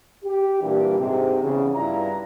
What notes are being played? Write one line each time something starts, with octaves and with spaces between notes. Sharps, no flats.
G4
A#2 E3 G3 D4 G4
G#2 C3
E2 C#3
G2 D4 E4 F4 A#5